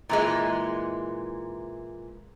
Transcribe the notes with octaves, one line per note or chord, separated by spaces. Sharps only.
A#2 E3 G#3